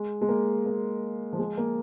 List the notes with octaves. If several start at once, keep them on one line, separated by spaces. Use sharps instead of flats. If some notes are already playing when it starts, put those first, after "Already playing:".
Already playing: G#3
G#3
A#3
A#3
F3
G#3
A#3